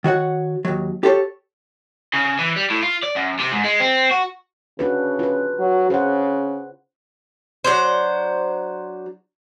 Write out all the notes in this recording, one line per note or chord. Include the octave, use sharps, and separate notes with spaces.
D#3 F#4 C#5 F#5
D#2 F#3
G4 A4 C5 C#5
C#3
E3
G3
A2
F4
D5
F#2
C3
G#2
G#3
C4
F#4
C#3 D4 F#4 B4
F4 B4
F#3
C#3 C5 F#5
F#3 D4 C5